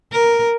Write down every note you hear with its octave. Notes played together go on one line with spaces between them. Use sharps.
A#4